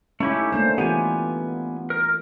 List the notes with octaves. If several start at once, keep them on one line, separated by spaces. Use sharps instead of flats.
A3 C#4 D#4 E4 G4
A3 A#3 D4 C5
E3 B3 F4 G4 G#5
A#4